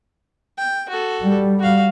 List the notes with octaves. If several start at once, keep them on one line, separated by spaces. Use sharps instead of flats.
G5
F#4 A4
G3
F#4 F5